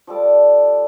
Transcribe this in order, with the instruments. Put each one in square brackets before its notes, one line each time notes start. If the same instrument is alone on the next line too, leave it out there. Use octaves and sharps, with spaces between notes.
[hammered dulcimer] F3 G3 A4 D5